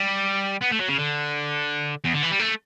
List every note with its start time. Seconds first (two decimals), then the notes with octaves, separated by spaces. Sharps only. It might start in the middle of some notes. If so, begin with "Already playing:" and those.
Already playing: G3
0.62 B3
0.72 A3
0.80 F#3
0.89 C#3
0.98 D3
2.04 E2
2.13 D3
2.23 E3
2.31 G3
2.39 A3